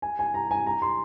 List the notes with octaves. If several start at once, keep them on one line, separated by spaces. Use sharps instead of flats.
G#5
G#5
A#5
G#5
A#5
C6